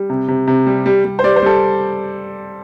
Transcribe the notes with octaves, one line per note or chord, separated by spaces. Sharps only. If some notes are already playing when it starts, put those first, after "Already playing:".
Already playing: G3
C3
C3
C3
G3
G3
G3
C5
G3 D5
C5
G3 A4